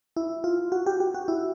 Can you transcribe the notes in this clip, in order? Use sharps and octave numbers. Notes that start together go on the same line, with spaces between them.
E4
F4
F#4
G4
G4
F#4
E4